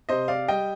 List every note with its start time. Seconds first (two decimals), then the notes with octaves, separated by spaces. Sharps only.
0.09 C3 C5 D#5
0.28 D5 F5
0.48 G3 D#5 G5